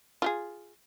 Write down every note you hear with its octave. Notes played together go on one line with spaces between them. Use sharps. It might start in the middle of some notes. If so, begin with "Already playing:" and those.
F4 G4 G#4